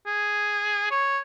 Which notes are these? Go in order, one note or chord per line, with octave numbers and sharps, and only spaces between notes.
G#4
C#5